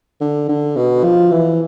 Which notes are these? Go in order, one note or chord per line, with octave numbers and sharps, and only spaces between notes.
D3
D3
B2
F3
E3